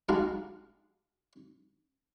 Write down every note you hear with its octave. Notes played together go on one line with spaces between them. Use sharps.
G3 G#3 D4 D#4 F#4 F5